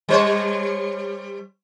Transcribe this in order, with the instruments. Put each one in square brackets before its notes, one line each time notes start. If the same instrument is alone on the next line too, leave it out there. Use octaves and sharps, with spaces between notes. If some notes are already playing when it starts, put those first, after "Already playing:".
[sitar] G3 C5 C#5